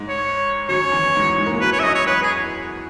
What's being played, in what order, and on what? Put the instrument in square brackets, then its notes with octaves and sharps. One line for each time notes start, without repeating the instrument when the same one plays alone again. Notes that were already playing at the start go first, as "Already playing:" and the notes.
Already playing: [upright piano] G#2 G#3
[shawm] C#5
[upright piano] F#2 F#3 [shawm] C#5
[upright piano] E2 E3
G#2 G#3
G#2 G#3
A#3
G#3
[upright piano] F#2 F#3 [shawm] B4
[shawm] C#5
E5
[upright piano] F#2 F#3 [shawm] D#5
[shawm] C#5
[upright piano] E2 E3 [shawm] B4
[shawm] G#4